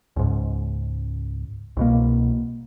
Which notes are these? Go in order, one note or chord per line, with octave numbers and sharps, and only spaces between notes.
C#2 G#2
C2 B2 A#3